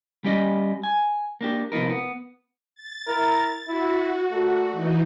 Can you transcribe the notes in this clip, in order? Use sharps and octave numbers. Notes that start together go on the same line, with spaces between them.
G3 C#4 G4 D5 D#5
G#5
A#3 D4 G4
C3 F3 B3 D#4 A#4
B3
A6
E4 A#4
E4 F#4
A#2 A3
E3 D#4